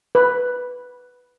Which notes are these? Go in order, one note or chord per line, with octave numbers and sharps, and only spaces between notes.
B4